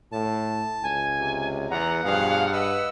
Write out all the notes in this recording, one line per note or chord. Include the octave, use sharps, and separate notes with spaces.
A2 A5
C#2 G#5
C3
E2 F#5 A#5
G2 B2 F3 G#4 F5
B4 D#5 E6